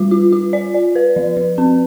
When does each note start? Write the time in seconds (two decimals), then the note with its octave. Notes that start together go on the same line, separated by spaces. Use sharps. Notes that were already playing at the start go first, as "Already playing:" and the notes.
Already playing: G3 F4
0.11 F4
0.33 F4
0.53 D5
0.74 D5
0.95 B4
1.16 F3
1.37 F3
1.58 C4